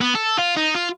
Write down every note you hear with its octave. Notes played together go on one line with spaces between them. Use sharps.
B3
A4
F4
D#4
F4